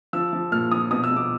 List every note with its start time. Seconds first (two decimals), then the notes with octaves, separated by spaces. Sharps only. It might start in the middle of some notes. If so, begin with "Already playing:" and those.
0.13 F3 E6
0.33 F3
0.52 A#2 F6
0.72 F3 D#6
0.91 B2 D#6
1.04 E6
1.11 B2
1.16 D6